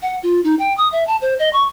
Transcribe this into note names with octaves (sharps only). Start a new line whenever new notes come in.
F#5
F4
D#4
G5
D#6
E5
A5
C5
D#5
C#6